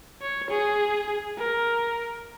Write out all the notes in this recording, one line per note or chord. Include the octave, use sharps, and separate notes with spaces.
C#5
G#4
A#4